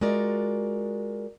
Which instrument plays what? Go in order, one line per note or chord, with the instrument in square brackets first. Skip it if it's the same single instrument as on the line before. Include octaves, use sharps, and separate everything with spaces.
[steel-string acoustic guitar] G#3 F4 F#4 A#4 D5